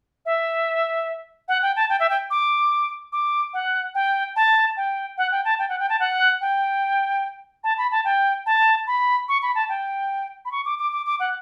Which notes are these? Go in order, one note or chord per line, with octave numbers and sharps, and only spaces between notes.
E5
F#5
G5
A5
G5
E5
G5
D6
D6
F#5
G5
A5
G5
F#5
G5
A5
G5
F#5
G5
A5
F#5
G5
A5
B5
A5
G5
A5
B5
C#6
B5
A5
G5
B5
C#6
D6
D6
D6
D6
F#5